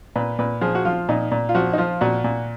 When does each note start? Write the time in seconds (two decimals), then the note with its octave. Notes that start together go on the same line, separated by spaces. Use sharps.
0.16 A#2 B4
0.39 A#2 B4
0.61 F3 G#4
0.75 F#4
0.85 F3 F4
1.09 A#2 D#4
1.32 A#2
1.49 F4
1.55 F3 F#4
1.73 D#4
1.78 F3 F4
2.01 A#2 F#4
2.24 A#2